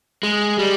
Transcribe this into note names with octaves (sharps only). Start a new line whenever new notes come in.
G#3
G3